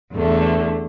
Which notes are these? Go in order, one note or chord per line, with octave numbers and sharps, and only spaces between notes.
E2 D3 A3